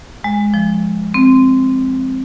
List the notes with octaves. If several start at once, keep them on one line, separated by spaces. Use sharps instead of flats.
G#3
F3
C4